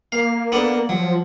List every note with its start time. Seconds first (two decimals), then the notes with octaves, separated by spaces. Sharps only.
0.12 A#3 F5
0.52 B3 D4 A4
0.89 F3 F#3